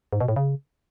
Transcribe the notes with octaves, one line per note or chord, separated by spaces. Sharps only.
G#2
B2
A2
C#3